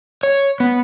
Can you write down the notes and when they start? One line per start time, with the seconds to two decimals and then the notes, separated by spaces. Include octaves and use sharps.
0.23 C#5
0.60 B3